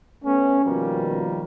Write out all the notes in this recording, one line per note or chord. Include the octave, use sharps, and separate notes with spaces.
A3 B3 C#4
B2 D#3 F3 G3 A#3